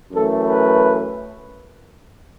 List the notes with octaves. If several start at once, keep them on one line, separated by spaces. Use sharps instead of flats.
F#2 E3 A3 A4
B4